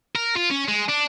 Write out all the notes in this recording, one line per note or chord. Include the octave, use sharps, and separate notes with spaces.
A#4
F4
C#4
G#3
D4